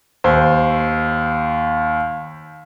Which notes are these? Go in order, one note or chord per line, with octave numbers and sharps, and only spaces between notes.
D#2 C5